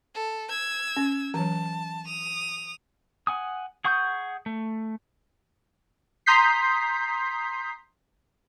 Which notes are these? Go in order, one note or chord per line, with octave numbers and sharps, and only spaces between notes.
A4
E6 G#6
C#4
E3 F#3 A5
D#6 F7
F#5 G#5 D#6
G#4 F#5 C#6 D#6 G6
A3
A#5 C6 D#6 G6 B6 C7